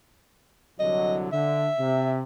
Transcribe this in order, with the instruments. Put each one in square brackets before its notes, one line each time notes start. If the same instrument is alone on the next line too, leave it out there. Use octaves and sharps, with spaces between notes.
[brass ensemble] C2 D3 F#3 [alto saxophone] D#5
[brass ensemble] D3 [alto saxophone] E5
[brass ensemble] C3